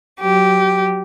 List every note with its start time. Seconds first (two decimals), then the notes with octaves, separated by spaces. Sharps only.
0.20 F#3 G4